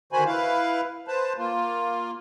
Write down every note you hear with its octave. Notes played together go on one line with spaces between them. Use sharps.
D3 D#3 F#4 C5 G#5 B5
E4 B4 F5
B4 C5 A5
A#3 F4